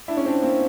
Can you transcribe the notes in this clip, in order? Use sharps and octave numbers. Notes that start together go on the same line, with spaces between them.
D4 E4
C#4
C4 D4
A#3 C4